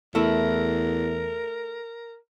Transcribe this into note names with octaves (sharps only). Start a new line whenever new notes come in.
E2 A3 E4 A#4